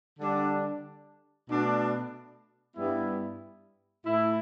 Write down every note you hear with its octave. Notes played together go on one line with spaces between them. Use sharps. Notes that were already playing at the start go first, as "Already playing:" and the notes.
D3 G3 D4
B2 A3 D4
G2 G3 B3 E4
A2 A3 E4